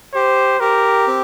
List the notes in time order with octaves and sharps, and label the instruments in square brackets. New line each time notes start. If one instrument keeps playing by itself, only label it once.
[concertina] G4 [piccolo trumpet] C5
[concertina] G4 [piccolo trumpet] A#4
[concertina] C4